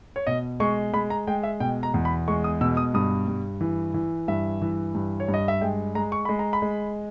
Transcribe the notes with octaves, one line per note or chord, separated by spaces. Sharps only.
C#5
B2 D#5
G#3 C#6
G#3 B5
A#5
G#3 G5
E5
B2 G5
A#5
E2
B5
G#3 C#6
D#6
B2 E6
D#6
G2 D#6
G2
E3
E3
G2 E5
E3
G2
C#5
G2
D#5
E5
G#3 G5
G#3 A#5
C#6
G#3 B5
A#5
B5
G#3